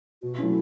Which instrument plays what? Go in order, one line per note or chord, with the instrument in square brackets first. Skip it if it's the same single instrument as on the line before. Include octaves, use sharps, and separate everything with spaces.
[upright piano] B2 [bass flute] F#4
[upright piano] F#3 A3 C#4 [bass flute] E4